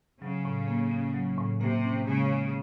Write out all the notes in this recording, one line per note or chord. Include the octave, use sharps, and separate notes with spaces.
C#3 F#3
A2
A#3
C#4
F#3
A2
C3 A#3
C#4
C#3 G#3
D#3